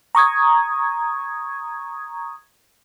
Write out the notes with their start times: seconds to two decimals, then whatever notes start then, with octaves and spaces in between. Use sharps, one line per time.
0.15 A#5 C#6 D#6 G#6